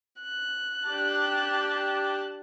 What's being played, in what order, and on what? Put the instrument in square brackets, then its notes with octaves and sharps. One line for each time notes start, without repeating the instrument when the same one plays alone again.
[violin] F#6
[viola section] D4 G4 A5